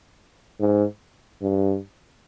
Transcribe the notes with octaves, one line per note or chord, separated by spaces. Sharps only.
G#2
G2